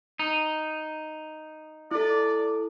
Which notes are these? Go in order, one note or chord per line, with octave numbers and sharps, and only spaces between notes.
D#4
E4 A4 D5